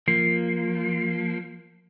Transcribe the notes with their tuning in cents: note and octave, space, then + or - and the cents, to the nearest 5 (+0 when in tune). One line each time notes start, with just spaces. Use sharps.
F3 +0 A#3 +0